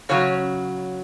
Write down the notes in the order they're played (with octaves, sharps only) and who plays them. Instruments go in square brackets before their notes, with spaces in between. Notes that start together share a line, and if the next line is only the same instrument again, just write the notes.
[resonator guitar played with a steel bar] C#3 F#3 C#4 C#5